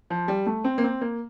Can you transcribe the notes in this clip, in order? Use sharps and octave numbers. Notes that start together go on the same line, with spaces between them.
F3
G3
A3
C4
A#3
C4
A#3